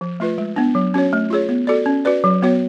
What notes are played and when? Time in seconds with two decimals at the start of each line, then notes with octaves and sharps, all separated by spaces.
0.01 F3
0.20 A3 F4 B4
0.38 G#3
0.56 B3 D4
0.75 F#3
0.94 C#4 F#4 C#5
1.13 A3
1.30 F4 G#4 C#5
1.49 B3
1.67 F#4 A4 D5
1.86 C#4
2.05 F#4 B4 D5
2.24 F#3
2.42 B3 F#4 C#5